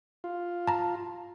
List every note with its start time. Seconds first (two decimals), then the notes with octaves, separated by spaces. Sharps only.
0.24 F4
0.67 A5 A#5